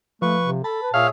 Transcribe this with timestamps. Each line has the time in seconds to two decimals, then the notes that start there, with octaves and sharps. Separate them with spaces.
0.22 F3 A3 B4 C#6
0.45 C3
0.64 A4 A5 B5
0.82 B4
0.94 A#2 G#4 C#5 E5 F5